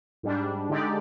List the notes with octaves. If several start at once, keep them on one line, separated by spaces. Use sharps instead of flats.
G#2 G3 D4
D3 G#3 D#4 G4 D5